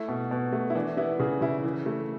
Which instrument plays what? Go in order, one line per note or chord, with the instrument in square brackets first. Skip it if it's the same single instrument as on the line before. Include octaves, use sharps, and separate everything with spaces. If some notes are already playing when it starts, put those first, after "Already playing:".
Already playing: [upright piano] A3 E4
B2
B2
A3
E4
E3 D4
B3 E4
C#3 G#4
C#3 E4
E3
A3